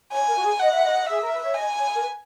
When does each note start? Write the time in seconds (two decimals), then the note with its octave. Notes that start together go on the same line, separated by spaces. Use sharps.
0.12 C#5 G#5
0.28 A#4
0.37 F#4
0.44 G#4
0.60 D#5 F#5
0.71 E5
0.83 D#5
1.07 G#4 E5
1.22 A#4
1.33 B4
1.43 C#5
1.54 D#5 G#5
1.79 C#5
1.94 A#4
2.02 B4